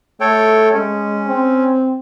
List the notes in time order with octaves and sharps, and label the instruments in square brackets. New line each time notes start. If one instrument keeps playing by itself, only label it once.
[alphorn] A3 [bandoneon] A4 C#5 G5
[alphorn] G#3 [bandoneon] C#4
[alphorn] C4